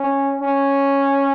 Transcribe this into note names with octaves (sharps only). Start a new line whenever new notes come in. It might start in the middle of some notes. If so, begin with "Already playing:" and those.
Already playing: C#4
C#4